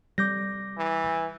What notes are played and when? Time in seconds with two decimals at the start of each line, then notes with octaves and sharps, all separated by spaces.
0.18 G3 D6 G6 A#6
0.78 E3